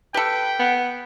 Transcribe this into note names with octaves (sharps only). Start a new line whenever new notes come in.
G4 A4 B4 G5
B3